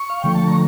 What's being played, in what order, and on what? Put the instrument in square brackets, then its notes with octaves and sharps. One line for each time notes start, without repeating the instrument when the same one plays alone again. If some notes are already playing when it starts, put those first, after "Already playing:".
Already playing: [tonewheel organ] C#6
F5
D3 F3 A3 G5
A5
A#5